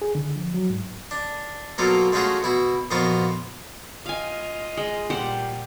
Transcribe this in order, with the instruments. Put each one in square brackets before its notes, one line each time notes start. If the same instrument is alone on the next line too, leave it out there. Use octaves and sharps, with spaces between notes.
[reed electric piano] G#4
D3
F3
F#3
G#2
[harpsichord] D4
B2 F#3 A#3 F4 A4
G#3 A3 C#4 F4 F#4 G#4
B2 E4 F#4
F2 A#2 B3 F4 F#4 A#5
[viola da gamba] F4 D#5 [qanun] F5 G#5
[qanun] G#3
[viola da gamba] A#2 G3 F4 [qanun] G4 C5 F#5